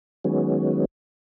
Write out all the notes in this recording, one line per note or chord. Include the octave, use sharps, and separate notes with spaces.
D#3 F#3 G#3 B3 C#4